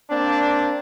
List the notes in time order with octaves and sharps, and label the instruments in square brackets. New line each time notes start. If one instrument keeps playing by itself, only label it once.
[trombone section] A#3 C4 D4